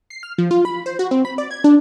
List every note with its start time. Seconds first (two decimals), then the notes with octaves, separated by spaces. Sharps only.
0.10 C7
0.23 F6
0.38 F3
0.51 F4
0.65 B5
0.86 C5
0.99 F#4
1.11 C4
1.25 B5
1.38 D5
1.51 G#6
1.64 D4